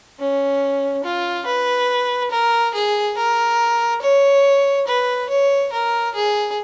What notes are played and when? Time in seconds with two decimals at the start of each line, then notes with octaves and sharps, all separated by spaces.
0.19 C#4
1.04 F4
1.46 B4
2.31 A#4
2.74 G#4
3.17 A#4
4.02 C#5
4.88 B4
5.30 C#5
5.73 A#4
6.15 G#4